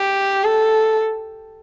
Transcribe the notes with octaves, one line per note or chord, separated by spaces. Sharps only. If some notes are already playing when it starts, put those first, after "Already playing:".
Already playing: G4
A4